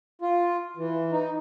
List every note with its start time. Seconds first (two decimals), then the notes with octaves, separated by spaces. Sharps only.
0.22 F4
0.77 E3
1.12 D#4